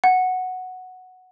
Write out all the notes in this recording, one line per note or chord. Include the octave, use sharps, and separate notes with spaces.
F#5